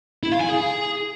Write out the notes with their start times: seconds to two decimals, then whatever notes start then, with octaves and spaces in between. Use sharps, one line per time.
0.23 E4
0.32 F5
0.41 G#5
0.50 G#4